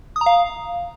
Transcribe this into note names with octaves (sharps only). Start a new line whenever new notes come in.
D#6
A#5
F5